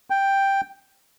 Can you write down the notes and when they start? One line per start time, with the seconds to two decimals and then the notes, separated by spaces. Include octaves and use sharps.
0.10 G5